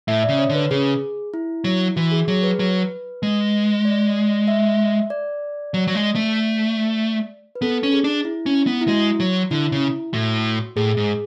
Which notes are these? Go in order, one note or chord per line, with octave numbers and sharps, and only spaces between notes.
A2 E5
C#3 D5
C#5
D3
B4
C#3 G#4
E4
F#3
E3 F#4
G#4
F#3 G#4
B4
F#3
G#3
D5
E5
D5
F#3
F#3
G#3
A3
B4
B3 A4
C#4
G#4
D4
E4
C#4
B3
E4
G#3 F#4
F#3
D3 E4
C#3
A2 F#4
A2 G#4
G#2